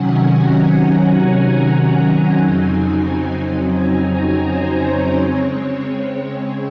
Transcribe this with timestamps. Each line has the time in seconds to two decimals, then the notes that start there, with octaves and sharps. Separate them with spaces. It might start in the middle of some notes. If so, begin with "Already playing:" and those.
Already playing: C3 D#3 F#3 C#4 F#5 G#5
0.27 A#5
1.66 G#5
2.01 F#5
2.36 F2 C#3 F#3 C4 D#4 G#5
3.76 A#5
4.11 G#5
4.46 C5
4.81 C#5
5.16 C#3 G#3 C4
5.85 C#5